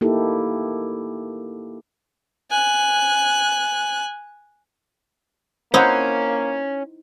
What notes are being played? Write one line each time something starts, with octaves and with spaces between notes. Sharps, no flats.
A#3 D#4 E4 G4 A4
G#5 F#6
A#3 C#4 D#4 E4 C5 F#5